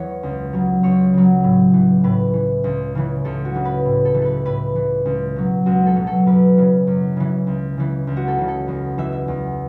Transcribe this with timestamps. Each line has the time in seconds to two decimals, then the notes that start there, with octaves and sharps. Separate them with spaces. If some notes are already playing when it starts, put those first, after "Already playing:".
Already playing: E2 E3 C#5 E5
0.23 C#2
0.53 C#3 F#3
0.83 C#2 C#5
1.13 C#3 F#3
1.44 A2
1.74 E3
2.04 A2 B4
2.33 E3
2.64 C#2
2.95 C#3 E3
3.25 C#2 A4
3.45 F#4
3.55 C#3 E3
3.65 B4
3.85 A2
4.05 A4
4.15 E3
4.21 A4 B4
4.45 A2 B4
4.76 E3
5.05 C#2
5.36 B2 F#3
5.66 C#2 F#4
5.86 A4
5.96 B2 F#3
6.07 A4
6.26 F#2 B4
6.57 C#3 E3
6.87 F#2
7.16 C#3 E3
7.47 C#2
7.77 C#3 E3
8.07 C#2
8.17 F#4
8.28 A4
8.38 C#3 E3
8.48 A4
8.68 E2
8.98 E3 E5
9.13 E5
9.28 E2